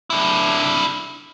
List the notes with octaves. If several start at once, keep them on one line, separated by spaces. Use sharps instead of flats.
D4 E4